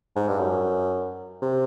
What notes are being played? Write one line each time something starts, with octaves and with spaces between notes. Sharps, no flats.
G#2
G2
F#2
C3